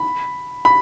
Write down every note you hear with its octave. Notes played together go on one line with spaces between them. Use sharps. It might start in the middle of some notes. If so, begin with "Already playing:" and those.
Already playing: B5
B5